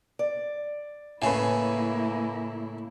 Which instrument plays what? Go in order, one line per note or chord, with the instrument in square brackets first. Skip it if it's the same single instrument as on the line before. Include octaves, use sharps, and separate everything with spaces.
[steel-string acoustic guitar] D5
[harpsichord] A2 C#3 [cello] A#3 E4 [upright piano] B4 G#5